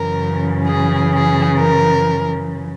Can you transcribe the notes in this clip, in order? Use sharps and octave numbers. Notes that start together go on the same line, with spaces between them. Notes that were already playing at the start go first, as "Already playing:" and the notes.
Already playing: F#2 C#3 E3 A#4
G#4
G#4
A#4